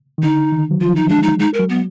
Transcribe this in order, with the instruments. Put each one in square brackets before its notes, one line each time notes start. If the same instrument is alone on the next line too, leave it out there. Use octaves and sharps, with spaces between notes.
[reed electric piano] D#3
[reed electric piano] D3 [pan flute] D#4
[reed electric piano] D#3
F#3
[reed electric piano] F3 [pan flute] F4
[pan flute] D#4
[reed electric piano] G#3 [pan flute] D4
[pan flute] D#4
[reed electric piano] G#3 [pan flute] D#4
[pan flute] A#4
[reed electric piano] F#3
[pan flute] B3